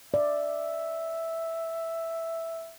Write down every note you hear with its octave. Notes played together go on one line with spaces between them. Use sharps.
D5 E5